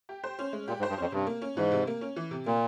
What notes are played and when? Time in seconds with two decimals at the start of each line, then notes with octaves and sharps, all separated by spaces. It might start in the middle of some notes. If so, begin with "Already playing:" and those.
0.09 G4
0.24 C5
0.39 C#4
0.53 G#3
0.68 A#2 G4
0.79 G#2
0.83 C5
0.89 G2
0.97 F2 C#4
1.12 G2 C3
1.27 A#3
1.42 C#4
1.56 G#2 E3
1.71 C3
1.87 A#3
2.01 C#4
2.16 E3
2.31 C3
2.46 A#2 A#3